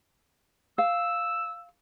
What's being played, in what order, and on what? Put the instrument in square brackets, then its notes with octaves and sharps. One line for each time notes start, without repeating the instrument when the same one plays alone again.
[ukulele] F5 [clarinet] E6